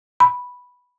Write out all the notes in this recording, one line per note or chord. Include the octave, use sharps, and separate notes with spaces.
B5